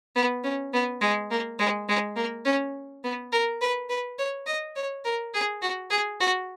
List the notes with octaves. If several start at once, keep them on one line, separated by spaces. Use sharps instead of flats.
B3
C#4
B3
G#3
A#3
G#3
G#3
A#3
C#4
B3
A#4
B4
B4
C#5
D#5
C#5
A#4
G#4
F#4
G#4
F#4